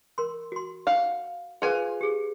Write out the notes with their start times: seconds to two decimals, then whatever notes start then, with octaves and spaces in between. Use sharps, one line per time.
0.18 A#4 C6
0.52 F#4 C6
0.87 F5 F#5
1.62 F4 G#4 B4 C5 G#5
2.01 G4 G#4